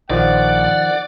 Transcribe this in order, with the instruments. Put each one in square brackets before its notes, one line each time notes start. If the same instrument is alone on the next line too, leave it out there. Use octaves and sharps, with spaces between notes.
[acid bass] A#1 [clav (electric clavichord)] D#3 F3 [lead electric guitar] D5 [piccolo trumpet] F#5